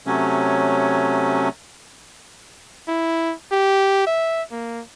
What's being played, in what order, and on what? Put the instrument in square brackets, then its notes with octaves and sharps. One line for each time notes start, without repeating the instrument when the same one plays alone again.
[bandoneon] C3 F#3 A3 C#4
[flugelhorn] E4
G4
E5
A#3